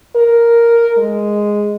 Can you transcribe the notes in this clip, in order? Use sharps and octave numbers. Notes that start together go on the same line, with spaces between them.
A#4
G#3